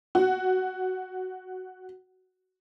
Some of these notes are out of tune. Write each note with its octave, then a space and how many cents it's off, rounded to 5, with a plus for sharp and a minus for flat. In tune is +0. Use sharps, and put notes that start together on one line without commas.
F#4 +5